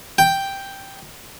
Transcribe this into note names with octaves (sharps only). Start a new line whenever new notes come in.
G5